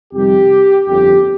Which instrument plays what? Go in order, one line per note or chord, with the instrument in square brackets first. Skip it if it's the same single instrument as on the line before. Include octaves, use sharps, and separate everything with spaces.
[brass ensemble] F2 C3 D#3 G3 G4
G1 F2 D3 G4